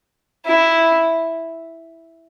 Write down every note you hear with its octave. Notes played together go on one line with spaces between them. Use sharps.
E4